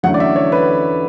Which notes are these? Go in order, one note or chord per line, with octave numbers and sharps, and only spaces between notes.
E2 D3 F#3 A3 C#4 F#5
D5
E5
C#5
B4